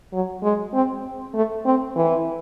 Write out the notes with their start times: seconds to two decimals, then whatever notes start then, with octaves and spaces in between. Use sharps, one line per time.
0.13 F#3
0.43 G#3
0.74 C4
1.35 A3
1.65 C4
1.96 E3